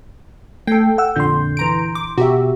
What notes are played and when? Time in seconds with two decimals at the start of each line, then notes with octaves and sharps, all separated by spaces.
0.67 A3 A4 G5
0.98 F#5 E6
1.16 F2 A#2 D3 C6 G6
1.57 E3 A#5 D7
1.95 D6
2.18 B2 F#4 G4 E5